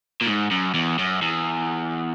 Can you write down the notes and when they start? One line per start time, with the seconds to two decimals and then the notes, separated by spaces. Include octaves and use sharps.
0.22 A#2
0.27 G#2
0.51 F#2
0.74 E2
0.99 F#2
1.22 E2